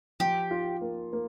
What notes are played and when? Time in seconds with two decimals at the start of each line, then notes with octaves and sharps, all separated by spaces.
0.20 F3 G4
0.51 F4
0.81 A#3
1.13 A#3